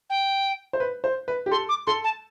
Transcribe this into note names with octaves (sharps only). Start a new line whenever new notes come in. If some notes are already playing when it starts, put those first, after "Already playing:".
G5
C5
B4
C5
B4
G4
A4 C6
D6
A4 C6
A5